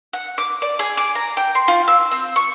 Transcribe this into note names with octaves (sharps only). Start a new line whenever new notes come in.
F#5
D6
D5
G#4
D6
A#5
G5
C6
F4
E6
C4
C#6